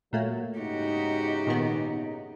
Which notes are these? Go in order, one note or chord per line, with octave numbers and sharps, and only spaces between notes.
A#2 F#3 A3 A#3
E2 G#2 C#3 D#4 F#4 G4
A#2 D#3 B3